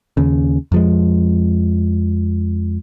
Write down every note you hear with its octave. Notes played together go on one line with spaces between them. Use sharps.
D#2 C#3
F2 F3 G#3